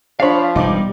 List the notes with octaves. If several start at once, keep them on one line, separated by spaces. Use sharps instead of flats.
F3 D4 C#5 F5 B5
E1 G2 G3 D#4 D6